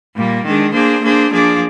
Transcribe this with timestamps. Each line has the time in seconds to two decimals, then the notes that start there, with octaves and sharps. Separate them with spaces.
0.16 A#2 G3 A#3
0.45 D#3 G#3 D4 G#4
0.73 A#3 D4 G#4 C5
1.02 A#3 D4 G#4 C5
1.31 F3 A#3 D4 G#4 D5